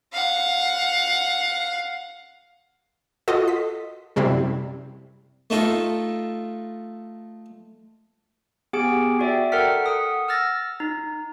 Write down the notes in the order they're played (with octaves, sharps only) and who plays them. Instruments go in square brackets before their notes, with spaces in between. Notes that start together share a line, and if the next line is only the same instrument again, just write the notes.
[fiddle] F5 F#5
[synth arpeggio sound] F4 F#4 A4 D#5
B6
F#2 C3 G3 C4 E4
[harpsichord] A3 D#4 F4 A4
[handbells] B3 G4 G#4 G#5 D7
F#4 D5 E5 G5
A4 A#4 F#5 G5 F6 B6
F#5 D#6
E6 F6 A6 A#6
D#4